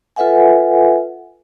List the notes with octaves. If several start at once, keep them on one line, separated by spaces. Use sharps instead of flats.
F4 A4 B4 E5 F#5 G#5